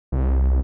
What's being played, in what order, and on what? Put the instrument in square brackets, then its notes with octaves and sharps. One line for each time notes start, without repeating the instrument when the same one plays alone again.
[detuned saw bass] C2